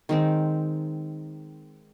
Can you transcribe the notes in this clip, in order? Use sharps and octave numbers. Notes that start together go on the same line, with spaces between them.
D#3 G#3 C4